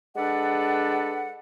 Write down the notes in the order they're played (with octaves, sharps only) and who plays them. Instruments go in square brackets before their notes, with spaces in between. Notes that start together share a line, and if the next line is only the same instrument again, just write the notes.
[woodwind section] G#3 D4 A4 B4 D5 F#5